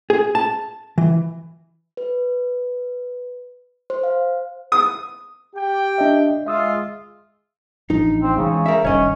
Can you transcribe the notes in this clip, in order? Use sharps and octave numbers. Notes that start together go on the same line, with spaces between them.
G#4
A5
E3
B4
C5
F5
D#6
G4 G5
D4 D#5 E5
G#3 F4 E5 D#6 E6
A1 F3 D4 D#4
C4
C#3 E3 G#3
A#4 E5
F1 G2 D#3 C#4 C#5 D#5